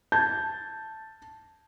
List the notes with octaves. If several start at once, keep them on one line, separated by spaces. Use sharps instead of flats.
A5 G6 G#6